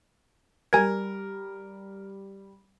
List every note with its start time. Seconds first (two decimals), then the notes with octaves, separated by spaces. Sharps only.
0.73 G3 A#4 G#5 G#6